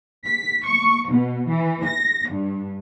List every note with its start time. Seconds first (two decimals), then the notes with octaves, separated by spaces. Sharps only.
0.24 B6
0.65 C#6
1.10 B2
1.49 E3
1.85 A#6
2.30 G2